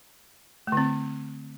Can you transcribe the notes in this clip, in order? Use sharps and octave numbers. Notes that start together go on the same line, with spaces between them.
D3 A3 C4